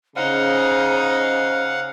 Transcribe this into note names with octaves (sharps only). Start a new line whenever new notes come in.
C#3 D#4 C5 F5 F#5